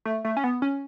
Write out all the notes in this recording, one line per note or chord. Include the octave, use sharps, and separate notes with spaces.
A3
A3
C#4
B3
C#4